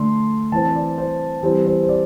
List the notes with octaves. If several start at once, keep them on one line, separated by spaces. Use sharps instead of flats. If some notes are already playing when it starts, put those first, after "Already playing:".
Already playing: D3 A3 D4 C6
E3 C4 A5
C5
D5
C5
E3 G3 C4
C5
C5
D5